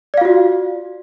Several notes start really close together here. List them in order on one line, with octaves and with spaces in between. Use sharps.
D5 F5 F4 F#4